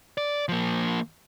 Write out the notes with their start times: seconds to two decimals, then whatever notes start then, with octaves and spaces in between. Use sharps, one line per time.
0.18 D5
0.49 F3 A#3